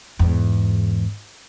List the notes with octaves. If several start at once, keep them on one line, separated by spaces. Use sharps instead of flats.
E2 G#2